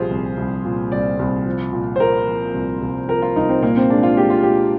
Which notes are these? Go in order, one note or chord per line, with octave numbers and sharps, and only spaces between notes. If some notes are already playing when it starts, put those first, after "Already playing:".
Already playing: C2 A#2 F3 F4 G4 G#4 C5
C2
C2
A#2
C2 D5
C2
F3
A#2
C5
A#2 A#4
F3
C2
C2
F3 A#4
F4
C2 D#4
C4
A#2 A#3
C4
G#3 D4
F4
G#3 G4
F4
A#2 G4